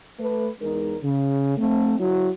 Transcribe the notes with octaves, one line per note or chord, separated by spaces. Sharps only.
A3 B4
E2 G#3 D#4 A#4
C#3
A3 C4
F#3 E4 F#4